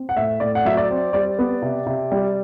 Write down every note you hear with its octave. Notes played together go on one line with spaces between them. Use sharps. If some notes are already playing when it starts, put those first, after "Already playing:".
Already playing: C4
F#5
A2 E5
A2 D5
F#5
F#3 E5
D5
C4
G3 D5
B3
C3
C3
G3